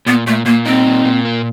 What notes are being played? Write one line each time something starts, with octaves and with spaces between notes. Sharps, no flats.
A#2 B3
A#2 A3
A#2 A#3
C4 D#4
A#2
A#2
A#3